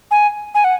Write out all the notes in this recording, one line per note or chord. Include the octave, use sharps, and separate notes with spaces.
G#5
G#5
F#5